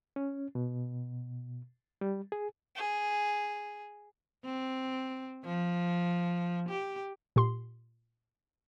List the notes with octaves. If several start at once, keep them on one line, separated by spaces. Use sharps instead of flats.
C#4
B2
G3
G#4
G#4
C4
F3
G4
A#2 G4 C6